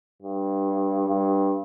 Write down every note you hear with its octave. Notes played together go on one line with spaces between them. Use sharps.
G2
G2